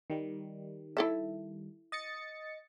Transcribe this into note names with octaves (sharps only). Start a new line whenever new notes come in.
D#3 G3
E4 A4 E5
D#5 A6 C#7